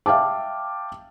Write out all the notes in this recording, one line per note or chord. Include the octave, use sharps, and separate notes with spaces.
E5 F5 G5 A5 D6